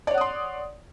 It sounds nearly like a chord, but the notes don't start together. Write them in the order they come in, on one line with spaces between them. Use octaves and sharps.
D5 C#5 F#5 D#6 C6